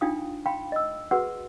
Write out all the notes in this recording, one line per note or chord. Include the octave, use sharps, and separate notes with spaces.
D4 D#4 F4 F5 G5 D#6
F5 G5 B5 C6
D#5 E6
F#4 G#4 B4 F#5 C6 E6